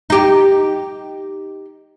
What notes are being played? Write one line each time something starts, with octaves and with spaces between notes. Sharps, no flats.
D#4 G4